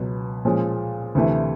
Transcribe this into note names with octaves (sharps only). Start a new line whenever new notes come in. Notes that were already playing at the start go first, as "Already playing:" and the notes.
Already playing: C#2 B2 F#3
A#2 F3 G#3 C#4
D2 C3 E3 A3